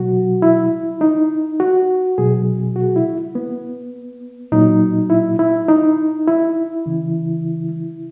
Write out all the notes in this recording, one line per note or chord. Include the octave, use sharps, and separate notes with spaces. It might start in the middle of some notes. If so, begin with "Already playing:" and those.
Already playing: B2 F#3 F#4
E4
D#4
F#4
B2 F#3 G#4
F#4
E4
B3
A#2 F#3 D#4
E4
E4
D#4
E4
C#3 E3